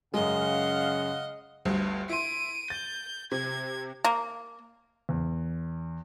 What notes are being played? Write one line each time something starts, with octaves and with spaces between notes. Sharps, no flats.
F#2 C#3 G#3 D#5 F5 F#5
G1 D2 G2
E4 C6 D7 D#7
G6 A6
C3 G#6
A#3
E2